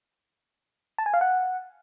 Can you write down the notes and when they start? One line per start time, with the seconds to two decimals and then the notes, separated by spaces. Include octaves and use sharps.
0.98 A5
1.06 G#5
1.14 F5
1.21 F#5